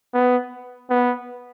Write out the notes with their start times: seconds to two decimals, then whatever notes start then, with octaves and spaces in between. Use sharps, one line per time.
0.13 B3
0.90 B3